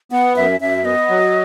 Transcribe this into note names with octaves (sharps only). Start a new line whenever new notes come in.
B3 F#5
F#2 E5
F#2 E5
B3 D#5
F#3